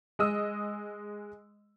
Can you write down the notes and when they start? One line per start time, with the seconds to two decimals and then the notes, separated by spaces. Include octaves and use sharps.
0.19 G#3 D#5 D#6 E6